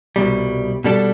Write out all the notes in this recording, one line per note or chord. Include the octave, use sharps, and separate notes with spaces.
C2 B2 G3
B2 G3 D4 A4